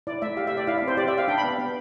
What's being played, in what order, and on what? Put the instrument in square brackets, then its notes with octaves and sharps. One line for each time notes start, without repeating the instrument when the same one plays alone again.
[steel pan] E4 D5
A3 E5
G4 F5
E5
G4
D5
E4 F5
E5
C4
C5
G4 D5
E5
G4
F5
D4 G5
B5
B3
B3